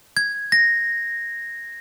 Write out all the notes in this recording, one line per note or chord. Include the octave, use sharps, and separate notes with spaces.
G#6
A#6